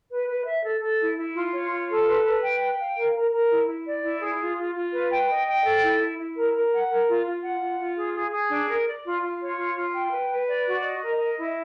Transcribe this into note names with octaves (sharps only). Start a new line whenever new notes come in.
B4
B4
E5
A4
A4
E4
E4
F4
C#5
F4
A4
B4
B4
G5
G5
F5
A#4
A#4
A#4
E4
E4
D5
E4
G#4
F4
F4
F4
B4
G5
D#5
G5
A4
E4
E4
E4
A#4
A#4
F#5
A#4
F4
F4
F#5
F4
F4
G#4
G#4
G#4
D4
A#4
D5
F4
F4
C#5
F4
F4
G5
B4
B4
D5
F#4
D#5
A#4
D#5
E4